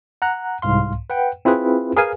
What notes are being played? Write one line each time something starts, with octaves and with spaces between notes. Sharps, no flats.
F#5 A#5 F#6
C2 G#2 F5 C6
B4 F#5 G5
C4 E4 F4 G#4 B4
G#4 A#4 B4 F5 G#5